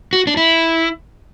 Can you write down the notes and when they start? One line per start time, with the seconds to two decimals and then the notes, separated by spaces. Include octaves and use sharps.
0.13 F#4
0.27 D4
0.37 E4